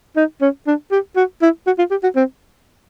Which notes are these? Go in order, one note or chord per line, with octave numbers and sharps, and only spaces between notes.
D#4
C#4
D4
G4
F#4
E4
F#4
F4
G4
F#4
C4